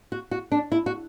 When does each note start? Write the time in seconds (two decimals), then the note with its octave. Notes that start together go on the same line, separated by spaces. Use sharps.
0.12 F#4
0.31 F#4
0.52 D4
0.72 E4
0.86 F#4